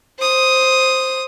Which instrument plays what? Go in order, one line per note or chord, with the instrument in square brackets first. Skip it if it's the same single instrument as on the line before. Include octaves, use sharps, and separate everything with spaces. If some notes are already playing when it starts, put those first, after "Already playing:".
[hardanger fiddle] C5 D#6